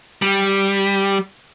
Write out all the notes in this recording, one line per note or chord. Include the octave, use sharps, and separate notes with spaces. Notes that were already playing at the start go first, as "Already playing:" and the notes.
G3